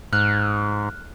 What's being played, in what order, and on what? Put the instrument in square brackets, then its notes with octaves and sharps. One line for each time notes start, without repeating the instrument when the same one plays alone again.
[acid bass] G#2 [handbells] F6 F#6